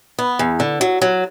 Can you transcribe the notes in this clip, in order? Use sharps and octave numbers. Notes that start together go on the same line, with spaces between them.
B3
E2
D3
F#3
F#3